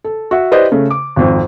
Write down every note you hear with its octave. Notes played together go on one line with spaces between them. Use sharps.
A4
F#4 E5
E4 G4 B4 C5 D5 D#5
C#3 A3
D6
G#1 F2